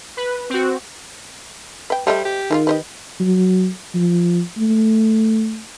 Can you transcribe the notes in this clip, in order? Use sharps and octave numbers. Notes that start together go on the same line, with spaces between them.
B4
C4 F#4
B4 G5
F3 G3 A3 D#5
G4
D#3 G#3 C#4 F4
G4 B4 C5 D#5
F#3
F3
A3